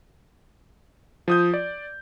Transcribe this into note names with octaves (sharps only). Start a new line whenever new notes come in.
F3 D#6 G6
D5